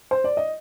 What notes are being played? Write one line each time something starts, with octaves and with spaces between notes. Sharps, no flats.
C5
D5
D#5